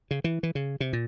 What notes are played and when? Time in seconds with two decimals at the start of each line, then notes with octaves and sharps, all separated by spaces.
0.11 C#3
0.24 E3
0.43 E3
0.55 C#3
0.80 C3
0.93 A#2